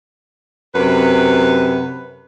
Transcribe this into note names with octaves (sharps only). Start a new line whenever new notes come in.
F#2 C3 B4